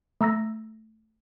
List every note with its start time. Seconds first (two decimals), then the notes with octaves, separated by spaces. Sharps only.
0.21 A3 A#5 E6 A#6